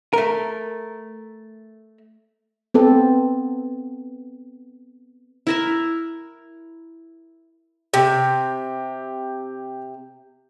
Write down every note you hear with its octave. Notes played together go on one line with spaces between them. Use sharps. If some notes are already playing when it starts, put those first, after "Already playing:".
A3 A#4
B3 C4 A4
E4 A#4 E5
C3 G4